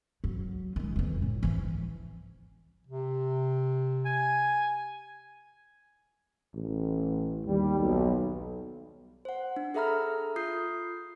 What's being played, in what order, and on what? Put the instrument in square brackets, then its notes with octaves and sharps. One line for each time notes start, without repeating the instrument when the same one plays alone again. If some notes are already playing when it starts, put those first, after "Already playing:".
[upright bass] F#3
D#3 G#3
F2 E3
A2
E3 F3
[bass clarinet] C3
[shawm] G#5
[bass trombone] A1
[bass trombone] D#2 [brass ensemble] G3
[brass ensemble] B1
[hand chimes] C5 F#5
D4
G#4 A4 E5 A#5 B5 F6
F4 D#6 G6 C7